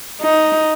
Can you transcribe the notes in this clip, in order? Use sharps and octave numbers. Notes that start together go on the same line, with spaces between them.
D#4